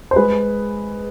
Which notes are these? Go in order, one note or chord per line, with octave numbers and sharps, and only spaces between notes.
C5
G#3 G#4 B4